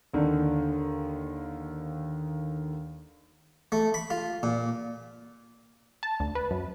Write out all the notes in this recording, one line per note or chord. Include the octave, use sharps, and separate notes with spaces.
D#2 D3 D#3
A3
B5
F4
A#2
A5
D2
B4
F#2